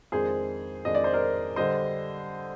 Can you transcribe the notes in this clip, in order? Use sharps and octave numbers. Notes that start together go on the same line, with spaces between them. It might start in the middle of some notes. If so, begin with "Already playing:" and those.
F2 D#3 G#3 D4 G#4 C5
F2 D#3 G#3 D4 D#5
D5
C5
A#4 D5
D3 G3 D4 C5 D#5